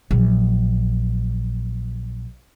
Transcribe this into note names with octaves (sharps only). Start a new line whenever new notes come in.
A#1 F#3